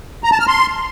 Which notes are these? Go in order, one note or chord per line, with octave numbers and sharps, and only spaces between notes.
A#5
A5
F6
C6